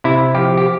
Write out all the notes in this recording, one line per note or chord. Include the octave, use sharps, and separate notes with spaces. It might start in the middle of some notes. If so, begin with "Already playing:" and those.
C3 E4
F3 G4
G4